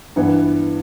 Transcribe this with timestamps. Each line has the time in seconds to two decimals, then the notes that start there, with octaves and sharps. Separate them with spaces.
0.16 G2 E3 B3